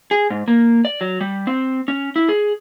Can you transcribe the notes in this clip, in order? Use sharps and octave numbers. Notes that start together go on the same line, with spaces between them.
G#4
G#2
A#3
D5
F#3
G3
C4
C#4
E4
G#4